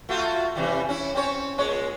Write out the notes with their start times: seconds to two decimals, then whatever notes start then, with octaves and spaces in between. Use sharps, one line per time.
0.09 A3 F4 F#4
0.56 C3 E3 G3
0.89 C#4 E4
1.14 C4 C#4 C#5
1.58 A#2 G#3 C#5